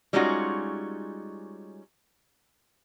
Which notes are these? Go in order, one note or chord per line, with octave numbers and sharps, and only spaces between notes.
G3 G#3 C#4 D#4 F4 F#4